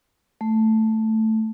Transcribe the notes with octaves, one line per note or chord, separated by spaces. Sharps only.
A3